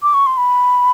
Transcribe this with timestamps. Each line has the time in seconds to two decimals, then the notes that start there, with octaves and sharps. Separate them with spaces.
0.03 D6
0.14 C#6
0.26 C6
0.37 B5